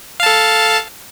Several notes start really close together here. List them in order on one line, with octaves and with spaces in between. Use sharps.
F5 A5 A4